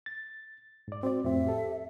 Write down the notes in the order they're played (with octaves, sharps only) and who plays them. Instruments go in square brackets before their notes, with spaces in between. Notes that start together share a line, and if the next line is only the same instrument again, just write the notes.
[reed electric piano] A6
G#2 D5
[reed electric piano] C4 C5 D5 [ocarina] F#4
[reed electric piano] F2 A2 C4 [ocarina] E5
[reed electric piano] G4 A4